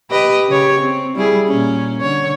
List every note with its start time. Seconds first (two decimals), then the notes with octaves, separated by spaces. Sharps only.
0.11 G4 B4 D#5
0.48 C#3 G4 C#5
0.80 C4
1.16 G3 E4 G#4
1.47 A#2 C#4
2.01 D3 C#5